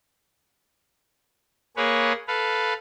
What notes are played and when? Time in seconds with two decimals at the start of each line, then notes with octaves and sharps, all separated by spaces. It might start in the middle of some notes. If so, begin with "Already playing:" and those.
1.77 A#3 G#4 B4 C#5
2.28 A4 B4 F5